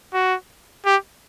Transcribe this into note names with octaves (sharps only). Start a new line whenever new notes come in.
F#4
G4